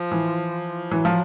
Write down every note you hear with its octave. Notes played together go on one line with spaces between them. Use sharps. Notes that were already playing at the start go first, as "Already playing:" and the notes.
Already playing: F3
E3
E3 F#3
F3